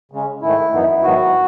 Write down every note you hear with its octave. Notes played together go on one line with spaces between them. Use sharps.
C#3 G#3 C#4
G#2 D#3 A3 E4
F#2 E3 B3 D#4
G#2 D#3 F#3 B3 F#4